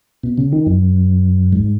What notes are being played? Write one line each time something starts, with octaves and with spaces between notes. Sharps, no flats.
B2
C#3
D#3
F#2
G#2